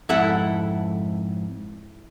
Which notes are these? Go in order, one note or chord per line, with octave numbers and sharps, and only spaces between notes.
F2 G#2 E4 A4 F#5